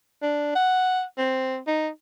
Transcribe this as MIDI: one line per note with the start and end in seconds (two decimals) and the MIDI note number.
0.22 0.53 62
0.55 1.03 78
1.18 1.58 60
1.67 1.89 63